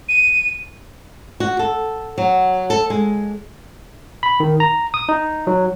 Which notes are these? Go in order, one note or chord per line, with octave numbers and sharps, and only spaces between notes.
D#7
F#4
A4
F#3
A4
G#3
B5
D#3
A#5
D#6
D#4
F#3